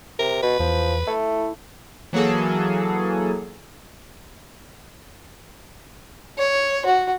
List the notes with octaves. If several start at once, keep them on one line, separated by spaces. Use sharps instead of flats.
C3 A#4
B2 B4
E2 F3
A3 E4
E3 F#3 A#3 G#4 A4
C#5
F#4